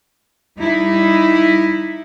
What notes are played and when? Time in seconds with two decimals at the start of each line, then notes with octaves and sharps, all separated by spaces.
0.58 G3 D#4 E4